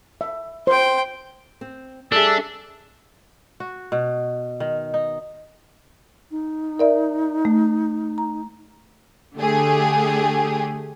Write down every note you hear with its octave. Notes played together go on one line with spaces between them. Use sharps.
E5
C5 G5 C6
C4
G3 D4 G#4 A4 E5 E6
F#4
B2
D#3
D#4
D#4
A#4 D5 E5
A3
A#5
D3 A3 G4 G#4